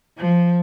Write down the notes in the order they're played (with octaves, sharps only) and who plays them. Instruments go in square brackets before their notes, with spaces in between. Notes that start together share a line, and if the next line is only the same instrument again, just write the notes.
[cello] F3